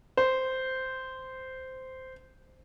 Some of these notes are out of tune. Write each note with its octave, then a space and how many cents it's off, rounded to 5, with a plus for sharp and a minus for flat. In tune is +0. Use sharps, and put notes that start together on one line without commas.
C5 -10